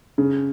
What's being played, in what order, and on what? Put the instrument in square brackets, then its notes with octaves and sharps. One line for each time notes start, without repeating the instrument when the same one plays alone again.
[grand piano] C#3